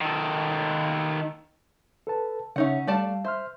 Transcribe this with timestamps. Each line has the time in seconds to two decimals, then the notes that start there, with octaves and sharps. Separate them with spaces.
0.01 D#3 A4
2.07 A4 B4 A5
2.56 C#3 C#4 D#4 C#5 E5 F#5
2.87 G3 A3 D5 F5 A5
3.25 C5 E5 C6 F6